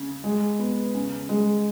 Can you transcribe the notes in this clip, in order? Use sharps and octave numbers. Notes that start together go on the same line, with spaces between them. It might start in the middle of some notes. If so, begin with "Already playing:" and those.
Already playing: C#3
G#3
B3
C#3
G#3